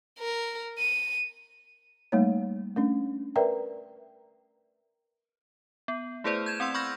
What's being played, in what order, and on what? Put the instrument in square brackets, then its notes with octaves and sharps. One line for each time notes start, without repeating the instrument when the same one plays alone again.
[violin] A#4
D#7
[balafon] G3 A3 A#3 D#4 C#5
A3 C#4 D4
A#4 B4 D5 E5 G5 A#5
[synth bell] B3
A3 E4 G#4 B4 C5 D5
G6 G#6 E7
C4 F#5 C6 E6
B5 C#6 F6 G6 A#6